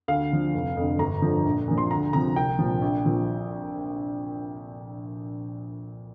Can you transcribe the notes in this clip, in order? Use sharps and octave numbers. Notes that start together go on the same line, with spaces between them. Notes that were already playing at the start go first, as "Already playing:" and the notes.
D2 F5
D3 F3
F1
F2 D3
G1 A#5
G2 D3 F3
A#1
A#2 F3
C6
D2 A#5
C3 F3 A#5
C2 G5
A#2 F3
A#1
A#2 F3